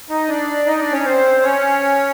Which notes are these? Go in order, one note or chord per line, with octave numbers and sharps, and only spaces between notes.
D#4 D#5
D4 D5
D#4 D#5
D4 D5
C#4 C#5
C4 C5
C#4 C#5